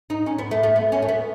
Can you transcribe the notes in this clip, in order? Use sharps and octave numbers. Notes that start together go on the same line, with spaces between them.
D#4
C#4
B3
A3
A3
B3
C#4
A3
B3